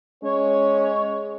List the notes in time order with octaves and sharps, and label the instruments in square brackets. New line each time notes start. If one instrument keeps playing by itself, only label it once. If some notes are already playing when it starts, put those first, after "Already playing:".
[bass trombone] G#3 [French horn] C#4 [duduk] C#5